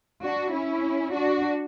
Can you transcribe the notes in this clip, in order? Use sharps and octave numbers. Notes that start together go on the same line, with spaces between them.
D4 F#4
C#4 E4
D4 F#4